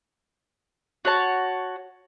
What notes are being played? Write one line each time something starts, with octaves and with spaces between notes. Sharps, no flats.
F#4 C#5 A5